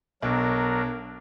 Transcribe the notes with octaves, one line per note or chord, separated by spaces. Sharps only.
B1 F#3 D4 A#4